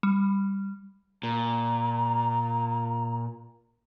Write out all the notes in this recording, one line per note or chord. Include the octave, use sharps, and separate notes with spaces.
G3
A#2 A#5